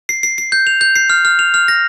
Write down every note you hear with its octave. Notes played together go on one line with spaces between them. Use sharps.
C7
C7
C7
G6
F7
G6
C7
F6
F6
F7
F6
A#6